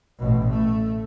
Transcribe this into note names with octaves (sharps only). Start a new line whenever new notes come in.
A1 B2
A3